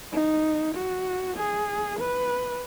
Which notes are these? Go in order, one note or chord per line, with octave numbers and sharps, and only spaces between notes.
D#4
F#4
G#4
B4